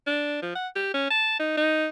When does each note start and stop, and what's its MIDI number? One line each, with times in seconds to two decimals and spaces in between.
0.07 0.41 62
0.42 0.51 53
0.55 0.68 78
0.76 0.89 67
0.94 1.06 61
1.10 1.35 81
1.39 1.52 63
1.57 1.87 63